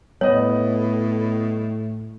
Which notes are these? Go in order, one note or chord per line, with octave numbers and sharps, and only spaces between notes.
A2 G3 B3 C#5 D#5